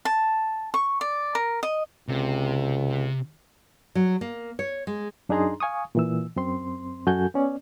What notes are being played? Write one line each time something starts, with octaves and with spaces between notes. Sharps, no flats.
A5
C#6
D5
A#4
D#5
C#2 C3
F#3
A#3
C#5
G#3
F#2 D4 D#4 G#4 A#5 C6
F5 G#5 C#6 D#6
A#2 E3 E6
F#2 C4 C6
F#2 F#4 A4 G#5 G6
B3 C#4 D5